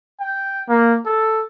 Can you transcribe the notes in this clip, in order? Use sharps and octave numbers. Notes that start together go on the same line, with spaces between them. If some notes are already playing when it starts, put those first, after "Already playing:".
G5
A#3
A4